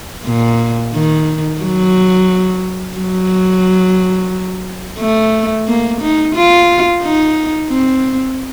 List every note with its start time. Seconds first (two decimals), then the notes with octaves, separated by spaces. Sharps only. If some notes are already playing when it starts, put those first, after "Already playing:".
0.26 A#2
0.94 D#3
1.61 F#3
2.97 F#3
5.00 A3
5.68 A#3
6.02 D#4
6.35 F4
7.03 D#4
7.70 C4